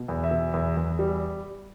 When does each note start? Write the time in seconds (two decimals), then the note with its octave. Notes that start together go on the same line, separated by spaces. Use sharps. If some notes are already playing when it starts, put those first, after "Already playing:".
Already playing: B2
0.08 E2
0.24 E5
0.31 B2
0.53 E2
0.77 E2
0.99 G3